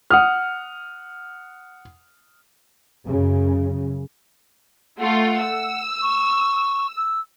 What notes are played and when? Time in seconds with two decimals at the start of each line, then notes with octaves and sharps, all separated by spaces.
0.10 F#5 D#6 F6
3.05 F#2 C#3
4.99 A3 F4 F#5
5.40 E6
6.02 C#6
6.97 E6